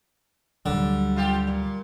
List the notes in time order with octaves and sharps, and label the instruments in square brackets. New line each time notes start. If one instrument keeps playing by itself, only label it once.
[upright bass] D2 F#3 [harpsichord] D3 [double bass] G3
[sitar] F4 G4
A#2